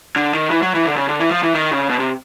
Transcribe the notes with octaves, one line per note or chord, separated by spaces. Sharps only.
D3
D#3
E3
F#3
E3
D3
C#3
D3
E3
F3
E3
D#3
C#3
B2
C3